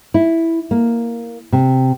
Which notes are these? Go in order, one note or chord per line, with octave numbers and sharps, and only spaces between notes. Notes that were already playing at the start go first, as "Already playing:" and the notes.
E4
A#3
C3